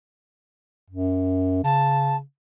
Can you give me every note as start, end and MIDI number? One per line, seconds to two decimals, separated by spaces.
0.90 1.59 42
1.64 2.21 49
1.64 2.16 81